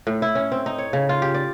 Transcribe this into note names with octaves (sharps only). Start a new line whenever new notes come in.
A2
E4
C#4
C4
D#4
C#5
C#3
F4
G4
D5